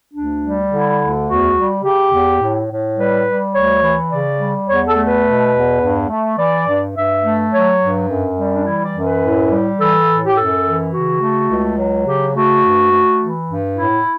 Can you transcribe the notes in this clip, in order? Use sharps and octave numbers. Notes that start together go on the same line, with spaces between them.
D2 D4
G3
D3 E4
D2
E2 F#4
G3
C#3 G4
E2
A2
A2
G3 B4
G3
D2 C#5
E3
C#3 D5
G3
E2 C#5
A4
A3
B4
B2
E2
G2
A3
E3 D5
G2
G2 E5
A3
F#3 C#5
G2
F#2
G3
D4
E3 E4
D5
F#2
B4
A2
G3
E3 A4
A2
G4
F#2 A4
E3
C#3 F#4
A3
C#2
F#3
C#3 G4
A3 F#4
G2
A3
E3
G2
A2 E4